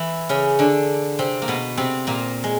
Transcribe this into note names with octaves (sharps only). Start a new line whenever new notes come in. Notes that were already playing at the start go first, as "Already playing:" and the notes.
Already playing: E3 E4
C#3 C#4
D3 D4
C3 C4
A#3
B2 B3
C3 C4
A#2 A#3
G#3